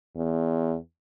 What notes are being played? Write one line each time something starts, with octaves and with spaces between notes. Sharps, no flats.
E2